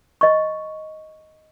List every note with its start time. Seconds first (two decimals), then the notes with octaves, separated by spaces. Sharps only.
0.21 D#5 C#6